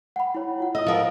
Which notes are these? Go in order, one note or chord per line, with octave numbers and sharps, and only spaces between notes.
F#5 G5 B5
E4 C#5
E4 F4 F#5
D#5 D#6 E6
F3 A#4